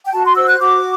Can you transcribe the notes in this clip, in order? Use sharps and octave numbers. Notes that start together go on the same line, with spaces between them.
G5
F#4 A5
C6
C5 E6
F#6
F#4 D6